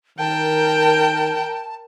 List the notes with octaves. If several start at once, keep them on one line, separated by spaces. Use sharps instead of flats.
D#3 A#4 G5 A5